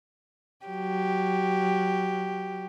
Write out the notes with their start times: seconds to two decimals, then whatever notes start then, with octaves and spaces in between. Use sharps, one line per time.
0.66 F#3 G4